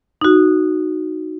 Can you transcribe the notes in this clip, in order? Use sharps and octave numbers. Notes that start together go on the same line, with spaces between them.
D#4 F#4